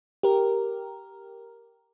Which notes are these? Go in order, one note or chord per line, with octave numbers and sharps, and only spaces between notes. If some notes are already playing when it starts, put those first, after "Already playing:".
G4 A#4